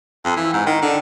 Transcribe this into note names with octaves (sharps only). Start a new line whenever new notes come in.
F2
E3
G#2
D#3
D3